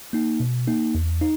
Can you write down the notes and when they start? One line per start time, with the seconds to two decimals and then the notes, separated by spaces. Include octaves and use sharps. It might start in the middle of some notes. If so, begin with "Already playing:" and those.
0.13 A#3 D#4
0.40 B2
0.68 A#3 D#4
0.95 E2
1.22 D#4